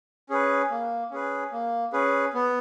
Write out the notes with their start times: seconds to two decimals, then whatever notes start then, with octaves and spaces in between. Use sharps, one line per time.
0.30 C#4 G#4 B4
0.71 A#3
1.11 C#4 G#4 B4
1.52 A#3
1.93 C#4 G#4 B4
2.34 B3